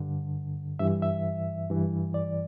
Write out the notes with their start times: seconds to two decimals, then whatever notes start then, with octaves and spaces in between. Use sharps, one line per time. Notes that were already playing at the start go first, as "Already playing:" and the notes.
Already playing: G2 D3
0.79 G2 E3 E5
1.02 E5
1.70 G2 E3
2.14 D5